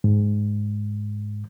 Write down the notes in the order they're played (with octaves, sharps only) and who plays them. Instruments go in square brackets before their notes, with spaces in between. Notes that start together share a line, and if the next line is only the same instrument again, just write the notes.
[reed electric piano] G#2